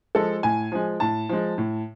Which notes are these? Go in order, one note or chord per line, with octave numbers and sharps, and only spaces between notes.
F3 G#3 A4
A2 G#5
F3 G#3
A2 A5
F3 G#3
A2